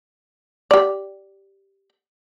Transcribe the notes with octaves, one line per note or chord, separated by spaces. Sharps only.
G4 D5